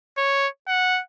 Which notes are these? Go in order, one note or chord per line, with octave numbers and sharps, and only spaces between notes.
C#5
F#5